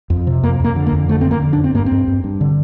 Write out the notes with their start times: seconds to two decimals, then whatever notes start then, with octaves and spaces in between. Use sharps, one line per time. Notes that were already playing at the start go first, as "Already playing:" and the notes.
0.10 F2
0.27 C3
0.43 F2 A#3
0.60 F2 A#3
0.76 D3
0.87 A#3
0.92 F2
1.09 D3 A3
1.21 D3 C4
1.31 A#3
1.42 F2
1.53 D4
1.58 F2
1.64 C4
1.75 G2 A#3
1.86 C4
1.91 G2
2.08 G2
2.24 G2
2.41 D3